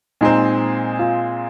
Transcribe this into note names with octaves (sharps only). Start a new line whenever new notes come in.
A#2 G#3 C4 D#4
F4